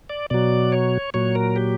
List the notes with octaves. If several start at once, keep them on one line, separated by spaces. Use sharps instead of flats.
D5
B2 F#3 D5
C#5
A#2 F#3 C#5
A#4
G4